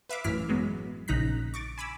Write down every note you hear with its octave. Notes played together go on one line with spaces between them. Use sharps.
B4 E5 F5 D6
A1 F#2 E3 F6 B6
F#3 G#3 B3
A#1 C#3 D#4 A#5 F#6 B6
C#6 D6 A6
G#5 B5 D6 E6